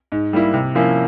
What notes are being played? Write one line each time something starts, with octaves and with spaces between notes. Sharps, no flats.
G#2
G3 A#3 E4
C3
F3 A#3 C#4 E4